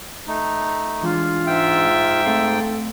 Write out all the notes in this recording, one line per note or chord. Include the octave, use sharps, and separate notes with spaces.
A3 D#4
E3 G#3 D4 F4
G#2 E5 G5
A3 C4 A4 F5